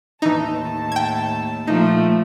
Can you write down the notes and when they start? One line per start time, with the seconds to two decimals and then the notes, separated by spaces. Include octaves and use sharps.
0.22 D#2 A2 E3 D#4 A5
0.92 G5 G#6
1.67 A#2 F3 A3 D#4